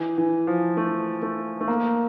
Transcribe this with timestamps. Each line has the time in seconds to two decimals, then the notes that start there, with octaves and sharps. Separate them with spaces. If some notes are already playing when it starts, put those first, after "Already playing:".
Already playing: E3
0.18 E3
0.47 F3
0.77 A3
1.23 A3
1.61 A3
1.68 A#3